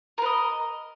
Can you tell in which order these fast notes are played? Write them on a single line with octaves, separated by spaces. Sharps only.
A#4 B4 D#5